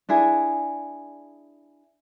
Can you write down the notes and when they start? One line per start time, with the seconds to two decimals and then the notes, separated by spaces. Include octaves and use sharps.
0.09 D4 E4 G#4